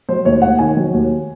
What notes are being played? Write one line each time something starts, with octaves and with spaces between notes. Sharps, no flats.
F#3 C5
D#2 C#5
D#2 F#5
D#3 G#5
F#3
D#2